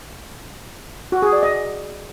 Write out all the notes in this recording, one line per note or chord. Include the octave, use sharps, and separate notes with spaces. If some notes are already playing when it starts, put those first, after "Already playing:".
F#4
G#4
D5
D#5